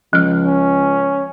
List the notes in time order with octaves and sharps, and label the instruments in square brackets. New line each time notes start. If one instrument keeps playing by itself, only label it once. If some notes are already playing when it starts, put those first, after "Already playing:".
[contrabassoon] C#2 [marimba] F3 F6
[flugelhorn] C#4